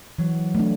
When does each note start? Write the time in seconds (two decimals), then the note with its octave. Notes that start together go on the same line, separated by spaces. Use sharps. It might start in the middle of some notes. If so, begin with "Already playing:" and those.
0.19 E3 F#3
0.55 A3 D4